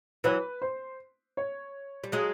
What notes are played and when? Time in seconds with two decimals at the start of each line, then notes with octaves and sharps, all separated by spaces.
0.24 E3 F#3 B4
0.62 C5
1.37 C#5
2.04 G3
2.12 F#3 G#3